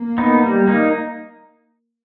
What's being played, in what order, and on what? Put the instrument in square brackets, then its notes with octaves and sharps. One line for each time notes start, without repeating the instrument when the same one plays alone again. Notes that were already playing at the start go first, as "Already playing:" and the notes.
Already playing: [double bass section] A#3
[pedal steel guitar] B3 D#4
G3
A#3 D#4